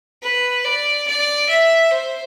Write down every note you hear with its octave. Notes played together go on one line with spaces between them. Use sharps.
B4
D5
D5
E5
C5